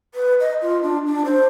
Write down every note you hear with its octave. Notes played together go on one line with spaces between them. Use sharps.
B4
D#5
F4
D4
D4
C5